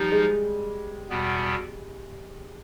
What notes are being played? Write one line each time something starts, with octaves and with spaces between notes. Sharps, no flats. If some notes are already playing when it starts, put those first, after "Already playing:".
Already playing: F3 G3 D#4
G#3
E2 B2 G3 B3